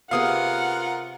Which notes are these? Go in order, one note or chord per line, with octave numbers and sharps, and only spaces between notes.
C3 B3 F4 G#4 A#4 F5 F#5 D#6